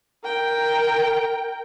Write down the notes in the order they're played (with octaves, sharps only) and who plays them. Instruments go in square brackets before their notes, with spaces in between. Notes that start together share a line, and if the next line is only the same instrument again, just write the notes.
[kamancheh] A#4 G5